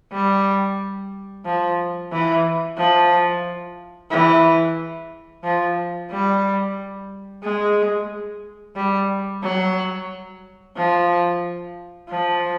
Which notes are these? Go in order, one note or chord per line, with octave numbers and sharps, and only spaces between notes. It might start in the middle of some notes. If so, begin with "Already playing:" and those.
G3
F3
E3
F3
E3
F3
G3
G#3
G3
F#3
F3
F3